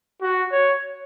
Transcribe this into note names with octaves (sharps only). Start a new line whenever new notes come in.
F#4
C#5